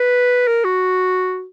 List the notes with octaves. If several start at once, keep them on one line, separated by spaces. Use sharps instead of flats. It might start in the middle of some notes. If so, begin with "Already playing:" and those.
Already playing: B4
A#4
F#4